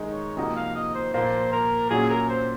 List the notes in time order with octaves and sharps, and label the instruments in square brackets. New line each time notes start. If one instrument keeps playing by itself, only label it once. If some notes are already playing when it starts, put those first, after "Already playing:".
Already playing: [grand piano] D#3 G#3 D#4 G#4
[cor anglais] C#5
[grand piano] C3 F3 A#3 D#4 F#4 [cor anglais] D#5
[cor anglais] F5
D#5
C5
[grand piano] A#2 F3 A#3 [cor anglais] C5
[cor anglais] A#4
[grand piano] A#2 F#3 C#4 F#4 [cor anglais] G#4
[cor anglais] A#4
C5